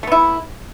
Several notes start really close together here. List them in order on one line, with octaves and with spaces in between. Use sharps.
A3 B3 E4